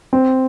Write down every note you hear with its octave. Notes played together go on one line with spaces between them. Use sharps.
C4